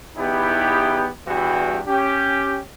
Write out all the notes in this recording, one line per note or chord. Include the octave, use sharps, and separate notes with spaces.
E2 B3 D#4 E4 G4
E2 G2 E3 G3 F#4 G4
C#4 G4